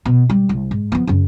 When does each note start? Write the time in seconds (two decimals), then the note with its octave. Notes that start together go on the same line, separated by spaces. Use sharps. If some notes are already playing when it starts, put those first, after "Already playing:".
0.05 B2
0.30 G3
0.49 C2
0.71 G#2
0.92 F3 B3
1.07 F#2 C#3